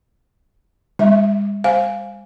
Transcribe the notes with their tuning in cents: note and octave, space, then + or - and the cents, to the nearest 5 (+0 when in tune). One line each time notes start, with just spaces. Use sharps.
G#3 -45 E5 -25
C5 +0 F5 +0 G#5 +0